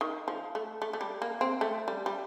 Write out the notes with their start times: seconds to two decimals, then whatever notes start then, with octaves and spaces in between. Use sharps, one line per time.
0.01 D#3
0.28 F3
0.55 A3
0.82 A3
0.93 A3
1.01 G3
1.22 A#3
1.41 C4
1.61 A3
1.88 G3
2.06 G3